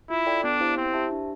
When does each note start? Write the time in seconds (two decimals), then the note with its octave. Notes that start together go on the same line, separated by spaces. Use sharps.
0.10 E4 F4
0.26 A4 D5 G5
0.44 B3 D4
0.60 E4 G4 C5 F5
0.77 C4 E4
0.94 G4 C5 E5 A5
1.11 D4